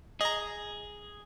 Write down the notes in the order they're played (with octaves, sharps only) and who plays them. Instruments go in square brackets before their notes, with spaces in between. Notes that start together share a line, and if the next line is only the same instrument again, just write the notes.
[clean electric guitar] G#4 [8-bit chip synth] D#5 A#5